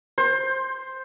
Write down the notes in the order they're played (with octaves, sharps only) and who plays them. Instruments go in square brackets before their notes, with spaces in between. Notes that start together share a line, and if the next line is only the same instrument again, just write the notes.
[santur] C5